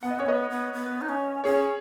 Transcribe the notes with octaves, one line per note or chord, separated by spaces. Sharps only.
B3 F#5
D#5
C#4 C#5
B3 B4 D#5
B3
B3
D#4
C#4
C#4 G#4 C#5